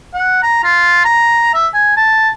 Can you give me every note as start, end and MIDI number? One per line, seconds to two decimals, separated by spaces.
0.14 0.40 78
0.43 0.61 82
0.64 1.01 65
1.05 1.52 82
1.54 1.67 76
1.74 1.92 80
1.97 2.30 81